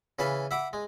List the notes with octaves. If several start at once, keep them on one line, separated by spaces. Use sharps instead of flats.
C#3 E3 B4 F5 A5 B5
E5 F#5 B5 D6
G#3